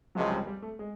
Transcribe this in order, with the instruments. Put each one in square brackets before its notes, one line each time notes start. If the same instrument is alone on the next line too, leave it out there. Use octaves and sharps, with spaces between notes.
[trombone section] C#2 C3 F3 G#3 [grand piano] F#3
[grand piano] G3
G3
A3
G#3